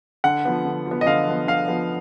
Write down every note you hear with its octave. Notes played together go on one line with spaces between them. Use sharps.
D3 F#5
F3 B3
D3
F3
B3
D#5
D3 F5
F3 B3
D3 F5
F3 B3